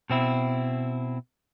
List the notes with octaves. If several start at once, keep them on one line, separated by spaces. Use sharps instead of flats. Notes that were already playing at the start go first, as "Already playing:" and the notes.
B2 C4 E4